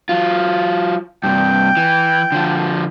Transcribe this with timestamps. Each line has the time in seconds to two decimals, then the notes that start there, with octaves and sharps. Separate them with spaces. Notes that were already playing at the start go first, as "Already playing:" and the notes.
0.09 F#3 F4
1.24 G2 C3 G5
1.77 E3
2.32 D3 F3